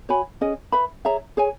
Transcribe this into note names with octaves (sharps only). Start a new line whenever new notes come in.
F#4 C#5 G#5 B5
C#4 G#4 D#5
B4 E5 B5
G#4 C#5 E5 A#5
G#4 C#5 G#5